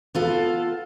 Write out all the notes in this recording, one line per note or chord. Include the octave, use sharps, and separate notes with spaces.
B3 F4 A4